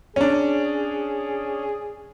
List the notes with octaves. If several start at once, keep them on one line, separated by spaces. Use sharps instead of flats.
C#4 D4 G#4